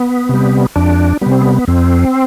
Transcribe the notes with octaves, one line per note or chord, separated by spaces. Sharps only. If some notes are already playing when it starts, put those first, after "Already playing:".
Already playing: B3
C3 G3
F2 D4
C3 G3 B3
C4
B3
F2 C4